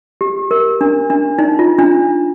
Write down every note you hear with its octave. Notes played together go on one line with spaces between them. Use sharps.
G4
A#4
D4
D4
D#4
F4
D4